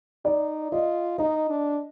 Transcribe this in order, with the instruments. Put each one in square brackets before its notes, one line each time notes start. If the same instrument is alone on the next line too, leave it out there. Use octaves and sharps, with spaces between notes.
[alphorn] D#4 [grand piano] D5
[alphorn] F4 [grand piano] D#5
[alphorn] D#4 [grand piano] D#5
[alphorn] D4